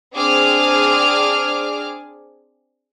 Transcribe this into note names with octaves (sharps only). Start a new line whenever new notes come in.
C4 D4 G#4 D6 F6